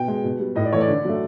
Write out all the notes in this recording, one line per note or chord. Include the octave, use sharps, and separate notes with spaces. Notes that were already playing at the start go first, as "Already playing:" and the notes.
Already playing: B2 G5
G#3
B2
G3
A2 D#5
D5
E3 A3 C#5
D5
D3
F#3 A3